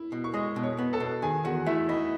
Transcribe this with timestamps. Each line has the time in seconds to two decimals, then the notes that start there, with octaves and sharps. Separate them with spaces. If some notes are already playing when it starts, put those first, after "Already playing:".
Already playing: E4
0.12 B2
0.24 C#6
0.34 G#3 D#5 D#6
0.56 B2
0.63 C#5 C#6
0.78 B3
0.93 A4 A5
1.00 B2
1.22 D#3 G#4 G#5
1.44 E2 F#4 F#5
1.66 A3 E4 E5
1.88 D#4 E4 D#5